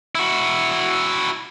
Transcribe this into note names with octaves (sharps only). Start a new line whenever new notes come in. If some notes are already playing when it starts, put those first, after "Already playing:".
E4 F#4